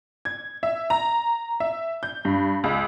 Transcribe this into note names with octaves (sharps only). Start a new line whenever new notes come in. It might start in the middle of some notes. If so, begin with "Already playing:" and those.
G#6
E5
A#5
E5
G6
G2
C#2